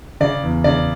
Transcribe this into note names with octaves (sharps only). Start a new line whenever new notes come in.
C#3 D5
E2
C#3 D5